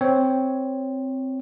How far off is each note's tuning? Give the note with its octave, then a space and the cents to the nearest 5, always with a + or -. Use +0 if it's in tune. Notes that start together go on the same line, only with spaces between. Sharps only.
C4 +0 C#5 +0